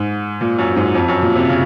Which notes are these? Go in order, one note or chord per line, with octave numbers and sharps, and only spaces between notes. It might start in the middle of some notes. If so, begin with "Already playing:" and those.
Already playing: G#2
A#2
F#2
G#2
F2
F#2
A#2
C3
C#3